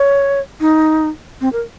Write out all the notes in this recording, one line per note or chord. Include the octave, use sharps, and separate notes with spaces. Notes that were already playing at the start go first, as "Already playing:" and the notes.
Already playing: C#5
D#4
C4
A#4